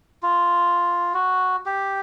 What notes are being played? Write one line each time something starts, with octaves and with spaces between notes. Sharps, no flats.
F4
F#4
G4